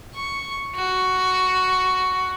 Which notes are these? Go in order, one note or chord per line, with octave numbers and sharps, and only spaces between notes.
C#6
F#4